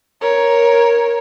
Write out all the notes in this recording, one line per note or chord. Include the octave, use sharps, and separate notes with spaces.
A#4 C#5